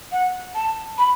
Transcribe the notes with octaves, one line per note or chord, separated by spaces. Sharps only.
F#5
A5
B5